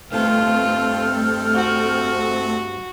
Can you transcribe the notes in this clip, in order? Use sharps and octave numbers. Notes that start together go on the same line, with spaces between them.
G2 A3 B3 C4 F4 A4 G5 F6
F#4